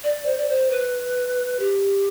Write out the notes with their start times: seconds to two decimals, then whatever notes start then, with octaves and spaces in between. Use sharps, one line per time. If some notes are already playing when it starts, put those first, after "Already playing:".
0.03 D5
0.25 C5
0.37 D5
0.49 C5
0.70 B4
1.59 G4